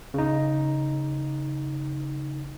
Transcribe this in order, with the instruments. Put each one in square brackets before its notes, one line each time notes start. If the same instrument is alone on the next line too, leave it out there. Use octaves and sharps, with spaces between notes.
[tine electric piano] C#3 D#4